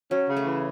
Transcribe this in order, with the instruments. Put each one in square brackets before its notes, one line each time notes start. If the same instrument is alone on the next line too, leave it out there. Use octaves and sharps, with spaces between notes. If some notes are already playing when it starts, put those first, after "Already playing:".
[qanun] F#3 [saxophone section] C#4
[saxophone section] C#3
[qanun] A3
[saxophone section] E3